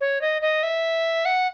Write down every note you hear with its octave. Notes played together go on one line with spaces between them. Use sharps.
C#5
D#5
D#5
E5
F#5